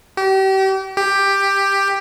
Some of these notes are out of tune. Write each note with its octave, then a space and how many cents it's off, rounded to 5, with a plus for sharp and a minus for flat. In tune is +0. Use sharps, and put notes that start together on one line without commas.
G4 -35
G4 +10